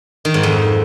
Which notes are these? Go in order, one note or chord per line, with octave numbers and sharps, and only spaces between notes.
D#3
G#2
F2